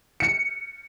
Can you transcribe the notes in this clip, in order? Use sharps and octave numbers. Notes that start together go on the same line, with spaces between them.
C#7